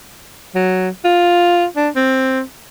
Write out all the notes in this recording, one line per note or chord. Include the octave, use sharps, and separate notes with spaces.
F#3
F4
D4
C4